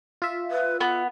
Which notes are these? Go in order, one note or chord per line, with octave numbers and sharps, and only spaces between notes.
F4 E5
B4
B3 F#5